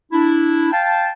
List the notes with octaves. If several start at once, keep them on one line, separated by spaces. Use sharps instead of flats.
D4 E4
F5 G5 A5